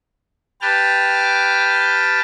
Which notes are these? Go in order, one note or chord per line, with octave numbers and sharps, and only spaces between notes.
G4 B4 G5 A5 F6